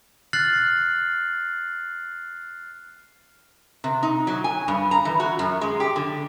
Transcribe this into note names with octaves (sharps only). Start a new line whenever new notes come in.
F6 F#6 A6 C7 F#7
C3
D#4
F#3
G#5
G2
A#5
E3
F#4
F#2
G#3
G4
D3